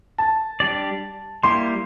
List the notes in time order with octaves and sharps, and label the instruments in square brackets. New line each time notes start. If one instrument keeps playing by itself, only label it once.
[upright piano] A5
[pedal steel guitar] G3 D4 G4 D5
[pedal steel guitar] G3 A#3 E4 G4 [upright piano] C6